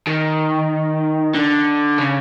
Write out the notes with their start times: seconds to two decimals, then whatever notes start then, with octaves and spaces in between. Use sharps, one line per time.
0.07 D#3
1.35 D3
1.99 C#3